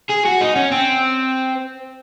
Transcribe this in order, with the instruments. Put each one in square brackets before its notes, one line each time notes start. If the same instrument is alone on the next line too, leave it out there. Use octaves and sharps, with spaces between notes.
[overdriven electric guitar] G#4
F#4
D#4
C#4
C4